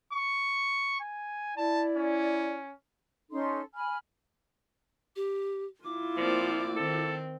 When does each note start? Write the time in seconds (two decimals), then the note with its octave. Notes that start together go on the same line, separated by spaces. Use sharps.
0.13 C#6
1.00 G#5
1.57 E4 D5 A5
1.97 C#4
3.31 C#4 D#4 A4 C6
3.74 G#5 B5 F6
5.16 G4
5.84 E4 F4 D6
6.17 F3 A#3 C4 D5
6.76 D#3 C4 A4